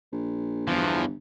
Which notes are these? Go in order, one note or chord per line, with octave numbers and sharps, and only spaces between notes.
A#1
G1 E2 E3 F3